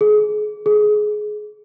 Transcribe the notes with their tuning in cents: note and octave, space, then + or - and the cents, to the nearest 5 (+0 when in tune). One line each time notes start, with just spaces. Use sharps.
G#4 +30
G#4 +20